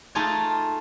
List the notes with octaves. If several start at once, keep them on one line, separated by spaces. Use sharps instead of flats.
A3 D#4 F4 G#4 A4 G#5